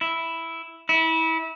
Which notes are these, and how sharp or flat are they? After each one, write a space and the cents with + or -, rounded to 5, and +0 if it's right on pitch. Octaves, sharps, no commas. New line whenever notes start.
E4 +0
E4 -25